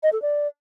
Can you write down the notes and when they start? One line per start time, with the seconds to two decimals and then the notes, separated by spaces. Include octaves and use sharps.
0.03 D#5
0.13 A4
0.22 D5